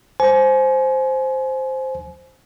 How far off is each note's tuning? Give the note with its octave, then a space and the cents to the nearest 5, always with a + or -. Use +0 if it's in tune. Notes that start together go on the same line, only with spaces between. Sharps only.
C5 +0 G#5 +30